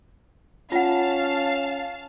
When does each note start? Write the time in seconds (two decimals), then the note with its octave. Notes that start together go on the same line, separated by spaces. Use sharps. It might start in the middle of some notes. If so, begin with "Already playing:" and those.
0.72 C#4 F4 F5 F#5 A5